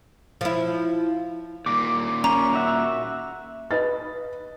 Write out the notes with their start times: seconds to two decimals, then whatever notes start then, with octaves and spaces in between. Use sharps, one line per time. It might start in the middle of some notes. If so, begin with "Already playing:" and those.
0.41 F3 E4
1.66 D#2 A#2 D6
2.24 C#4 A#5
2.54 F#4 E5 F#5
3.71 B4 D#5 A6